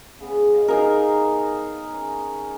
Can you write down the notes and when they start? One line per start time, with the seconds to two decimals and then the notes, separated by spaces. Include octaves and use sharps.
0.20 C#3 B3
0.54 D#5 F5
0.68 D#4 G#4 A#4
1.94 C#4